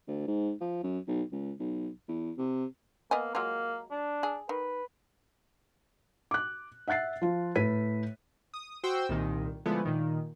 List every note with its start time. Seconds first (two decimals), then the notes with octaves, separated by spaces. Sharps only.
0.08 D2
0.27 G#2
0.61 F3
0.83 F#2
1.08 B1
1.32 C#2
1.59 B1
2.08 E2
2.37 C3
3.11 A#3 B3 D#5 G#5
3.35 F#3 G#3 A#3 F4
3.91 D4
4.23 G#4
4.49 D#3 B4
6.31 D6 F#6
6.88 E5 F#5 F#6 A6 C7
7.22 F3 F4
7.56 A2 B4 B6 D#7
8.54 D#6
8.84 F#4 C5 G5 E6
9.09 C2 A#2 D#3
9.66 D3 F3 G#3 A3 B3 E4
9.85 A#2 D#3